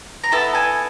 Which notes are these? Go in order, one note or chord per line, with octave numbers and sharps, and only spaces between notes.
A#5
B3 E4 A4 A5
G#5